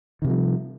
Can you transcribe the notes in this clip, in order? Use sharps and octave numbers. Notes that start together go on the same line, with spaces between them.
C3 D#3 F3 G3